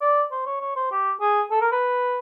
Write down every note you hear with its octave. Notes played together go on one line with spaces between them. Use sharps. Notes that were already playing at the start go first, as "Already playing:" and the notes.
D5
C5
C#5
C#5
C5
G4
G#4
A4
A#4
B4